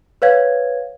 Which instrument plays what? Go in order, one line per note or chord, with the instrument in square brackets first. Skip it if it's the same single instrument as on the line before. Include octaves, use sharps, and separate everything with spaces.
[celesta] B4 C#5 F5 G#6